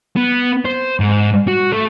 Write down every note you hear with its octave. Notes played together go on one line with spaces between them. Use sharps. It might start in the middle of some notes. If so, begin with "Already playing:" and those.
B3
C5
G#2
F#4
A3